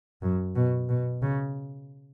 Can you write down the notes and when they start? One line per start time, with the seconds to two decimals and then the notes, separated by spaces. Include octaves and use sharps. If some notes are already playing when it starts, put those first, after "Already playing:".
0.22 F#2
0.55 B2
0.89 B2
1.22 C#3